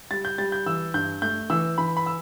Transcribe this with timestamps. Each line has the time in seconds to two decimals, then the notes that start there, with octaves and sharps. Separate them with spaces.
0.11 G3 A6
0.25 G6
0.38 G3 A6
0.52 G6
0.66 E3 E6
0.94 G2 G6
1.22 A3 G6
1.50 E3 E6
1.78 E3 B5
1.97 B5
2.06 E6